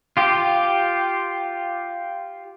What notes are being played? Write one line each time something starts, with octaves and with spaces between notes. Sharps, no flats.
F4 G4